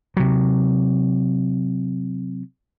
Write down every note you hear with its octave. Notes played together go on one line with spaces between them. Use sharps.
C3 F#3